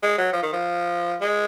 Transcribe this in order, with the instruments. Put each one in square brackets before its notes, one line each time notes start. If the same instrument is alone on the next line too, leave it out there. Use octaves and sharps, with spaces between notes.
[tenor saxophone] G#3
F#3
F3
D#3
F3
G#3